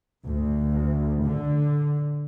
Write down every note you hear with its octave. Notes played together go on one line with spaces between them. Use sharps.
D2
D3